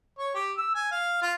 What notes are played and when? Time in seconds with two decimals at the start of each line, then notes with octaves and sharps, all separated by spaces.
0.18 C#5
0.34 G4
0.57 E6
0.75 G#5
0.91 F5
1.22 F4